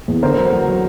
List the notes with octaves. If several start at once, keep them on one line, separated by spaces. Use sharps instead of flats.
E2
D3 A#4 C5
F#3
F#3
F#3